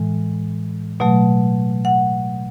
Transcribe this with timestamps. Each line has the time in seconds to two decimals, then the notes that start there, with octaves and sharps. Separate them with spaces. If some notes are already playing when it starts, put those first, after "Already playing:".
Already playing: A2 E3 G#3
1.00 B2 F#3 A3
1.85 F#5